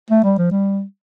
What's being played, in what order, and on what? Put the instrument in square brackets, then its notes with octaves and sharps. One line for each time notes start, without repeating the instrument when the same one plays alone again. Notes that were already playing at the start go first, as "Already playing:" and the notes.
[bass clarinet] A3
G3
F3
G3